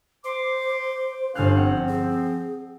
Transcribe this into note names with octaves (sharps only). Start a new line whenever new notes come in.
C5 C6 D6
G1 C#4 C5 F5 F6 F#6
F3 C4 F#5
G#4